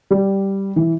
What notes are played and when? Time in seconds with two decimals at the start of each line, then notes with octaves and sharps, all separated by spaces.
0.11 G3
0.76 E3